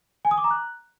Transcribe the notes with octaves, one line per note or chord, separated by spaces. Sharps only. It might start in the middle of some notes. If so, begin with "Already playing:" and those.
G#5
D#6
D6
A#5
F#6